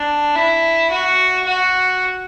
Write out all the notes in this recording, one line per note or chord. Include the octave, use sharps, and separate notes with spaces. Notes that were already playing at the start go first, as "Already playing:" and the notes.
Already playing: D4
E4
F#4
F#4